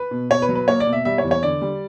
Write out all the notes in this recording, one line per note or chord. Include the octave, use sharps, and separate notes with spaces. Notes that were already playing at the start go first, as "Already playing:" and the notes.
Already playing: B4
B2
B2 C#5
B4
F#3
B4
A#3 C#5
D5
B2
E5
G3 E5
C#5
E2
C#5
D3 D5
G3